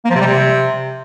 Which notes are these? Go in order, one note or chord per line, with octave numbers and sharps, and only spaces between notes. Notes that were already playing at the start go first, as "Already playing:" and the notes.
A#3
F3
C3
G3
C3